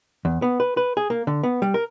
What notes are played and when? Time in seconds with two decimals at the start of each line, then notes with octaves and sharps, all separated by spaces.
0.25 E2
0.42 B3
0.60 B4
0.77 B4
0.97 G#4
1.10 A#3
1.27 D3
1.43 B3
1.62 G3
1.74 A#4